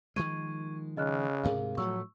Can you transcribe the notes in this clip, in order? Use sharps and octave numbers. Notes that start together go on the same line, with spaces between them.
D#3 F3 G#3 C#6 G#6 D#7
C#3 D#5 F6 F#6
D2 G#2 C3 G#4 A#4 F5
A2 F3 F#3 A3 C#6 E6